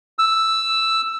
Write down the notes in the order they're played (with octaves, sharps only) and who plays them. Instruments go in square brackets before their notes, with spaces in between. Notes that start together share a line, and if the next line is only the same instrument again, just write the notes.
[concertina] E6